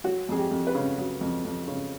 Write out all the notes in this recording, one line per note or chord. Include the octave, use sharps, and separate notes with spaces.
F#3 F#4
F2 G#4
G4
F2
B4
C#3
F#3
F2
F2
C#3